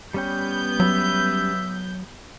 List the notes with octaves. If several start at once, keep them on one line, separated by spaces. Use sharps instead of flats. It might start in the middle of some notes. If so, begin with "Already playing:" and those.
G3 B3 C#4 G5 G6
F#3 E5